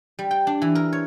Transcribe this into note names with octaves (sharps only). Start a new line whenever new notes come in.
G3
G5
D4
E3
A#4
C#5